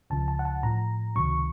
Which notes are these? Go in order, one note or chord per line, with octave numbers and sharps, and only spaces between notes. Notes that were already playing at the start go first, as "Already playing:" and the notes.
C#2 C#3 F3 A5
A5
F#5
A5
A2 F3 A#5
C#2 C3 D#3 F#3 C#6